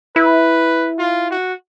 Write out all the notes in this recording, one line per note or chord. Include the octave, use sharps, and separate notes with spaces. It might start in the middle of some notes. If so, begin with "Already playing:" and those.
E4 B4
F4
F#4